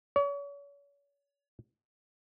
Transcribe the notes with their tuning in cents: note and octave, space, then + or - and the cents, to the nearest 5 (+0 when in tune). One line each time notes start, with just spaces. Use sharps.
C#5 +40